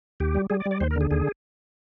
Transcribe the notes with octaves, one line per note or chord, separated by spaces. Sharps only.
D#2 G4
G3
G3 G#4
D5
G3
D5
D#2 C5
A#4
D3 G#4
D#2 G#4